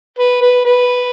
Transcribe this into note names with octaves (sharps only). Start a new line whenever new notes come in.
B4
B4
B4